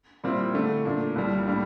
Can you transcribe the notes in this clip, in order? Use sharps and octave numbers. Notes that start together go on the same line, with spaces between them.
A#2 G3 C4 E4
D3 A3 D4
A#2 A3 D4
C2 A#2 G3
A2 G3 A#3 D4